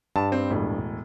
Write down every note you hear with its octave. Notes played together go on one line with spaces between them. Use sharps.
G2 A5
C4
E1 A2